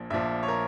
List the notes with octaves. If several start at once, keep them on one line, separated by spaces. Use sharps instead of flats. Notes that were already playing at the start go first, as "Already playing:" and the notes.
Already playing: A#1 A#2 F3
A#1 A#2 F3 E5
C#5
A#4